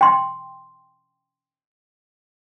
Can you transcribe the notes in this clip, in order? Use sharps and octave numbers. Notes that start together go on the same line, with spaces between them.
G5 C6